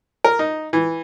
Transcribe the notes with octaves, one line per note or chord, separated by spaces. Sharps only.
A#4
D#4
E3